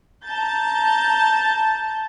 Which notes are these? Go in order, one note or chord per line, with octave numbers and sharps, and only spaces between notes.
A5 A#5 G6 A6